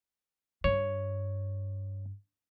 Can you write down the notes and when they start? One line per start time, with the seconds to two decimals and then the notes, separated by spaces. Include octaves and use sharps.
0.64 G2 C#5